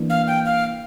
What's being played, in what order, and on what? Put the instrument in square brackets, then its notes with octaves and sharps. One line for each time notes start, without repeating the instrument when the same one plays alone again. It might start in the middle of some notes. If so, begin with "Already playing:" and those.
Already playing: [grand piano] E3 A#3 D4
[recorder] F5
G5
F5